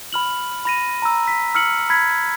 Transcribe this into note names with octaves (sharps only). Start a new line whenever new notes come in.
B5 F6 F#7
B5 A#6 D#7
A#5 E6
B6
E6 F6 C#7 F#7
B5 G#6 B6